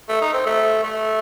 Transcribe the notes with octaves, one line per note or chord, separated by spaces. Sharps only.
A3
D#4
C4
A3
A3